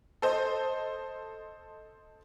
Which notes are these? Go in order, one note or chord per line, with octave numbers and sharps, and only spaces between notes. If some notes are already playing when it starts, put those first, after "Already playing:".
A4 C5 D#5